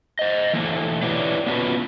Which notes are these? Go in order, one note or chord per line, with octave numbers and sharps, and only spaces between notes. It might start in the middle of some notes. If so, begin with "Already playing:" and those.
C5 D#5
E3 A3 A#3
E4 G4 B4 C#5 D5 F#5
A#3 B3 C#4 F4 F#4 B4